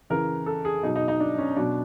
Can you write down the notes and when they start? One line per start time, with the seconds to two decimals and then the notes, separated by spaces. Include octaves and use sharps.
0.10 C#3 E3 A#4
0.46 A4
0.65 G#4
0.83 B2 F#3 D#4
0.96 D#4
1.08 D#4
1.20 D4
1.38 C#4
1.56 B2 F#3 D4